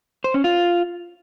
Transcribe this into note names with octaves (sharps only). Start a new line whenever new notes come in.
C5
C#4
F4